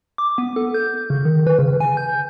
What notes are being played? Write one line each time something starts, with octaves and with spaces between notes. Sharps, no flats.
D6
B3
A4
G6
C#3
D#3
B4
C#3
G#5
G6